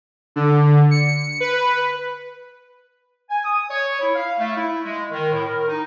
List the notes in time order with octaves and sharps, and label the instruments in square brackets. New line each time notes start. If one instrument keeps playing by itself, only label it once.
[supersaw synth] D3
C#7
B4
[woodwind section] G#5
D#6
C#5
E4
F5
A3
E4
G#3
D#3
A2
A#4
D#4